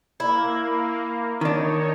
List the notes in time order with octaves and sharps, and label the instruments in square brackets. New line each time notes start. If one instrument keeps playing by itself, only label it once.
[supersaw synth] A#3 [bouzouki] E4
[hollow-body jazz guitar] D#3 D4 [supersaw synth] D#4 C#5